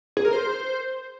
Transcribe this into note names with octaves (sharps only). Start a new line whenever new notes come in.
G#4
A#4
C5